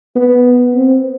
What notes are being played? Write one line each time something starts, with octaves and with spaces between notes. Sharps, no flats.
B3
C4